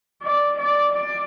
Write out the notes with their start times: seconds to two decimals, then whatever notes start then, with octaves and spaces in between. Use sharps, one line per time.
0.22 D5
0.58 D5
0.93 D5